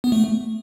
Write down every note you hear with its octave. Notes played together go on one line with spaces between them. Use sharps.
B3
A3